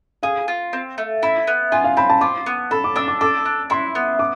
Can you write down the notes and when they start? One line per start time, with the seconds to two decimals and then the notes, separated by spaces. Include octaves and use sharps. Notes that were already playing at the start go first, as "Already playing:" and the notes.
0.23 G#4 F5
0.48 F4
0.73 C4
0.98 A3
1.23 E4 B5
1.47 B3
1.72 F4 G#5
1.84 F5
1.97 C4 B5
2.10 A5
2.21 F4 D6
2.46 B3
2.71 A4 B5
2.84 D6
2.96 D4 E6
3.08 D6
3.21 A4 D6
3.46 D4
3.70 E4 C6
3.95 B3
4.19 D6